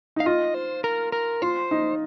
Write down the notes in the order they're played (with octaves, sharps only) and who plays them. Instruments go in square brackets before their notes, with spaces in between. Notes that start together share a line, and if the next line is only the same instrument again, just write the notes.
[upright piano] D#4 [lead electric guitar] F5
[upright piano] F4 [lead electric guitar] D#5
[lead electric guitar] C5
A#4
A#4
[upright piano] F4 [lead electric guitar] C5
[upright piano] D#4